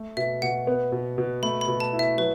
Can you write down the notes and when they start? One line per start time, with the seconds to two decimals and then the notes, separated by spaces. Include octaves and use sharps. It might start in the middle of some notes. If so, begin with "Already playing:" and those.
Already playing: A3
0.17 B2 E5
0.42 B2 F#5
0.67 B3
0.92 B2
1.18 B2
1.43 A3 B5
1.61 B5
1.68 B2
1.80 A5
1.93 E4
1.99 E5
2.18 F#3 B4